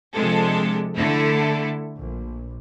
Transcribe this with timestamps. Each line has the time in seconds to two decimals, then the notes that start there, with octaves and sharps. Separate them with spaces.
0.14 C3 F3 G#3 D4 A4
0.97 D3 A3 E4 A4
1.97 A#1